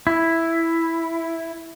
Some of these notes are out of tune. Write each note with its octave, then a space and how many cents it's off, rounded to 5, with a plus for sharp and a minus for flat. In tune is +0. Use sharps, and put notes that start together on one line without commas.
E4 +0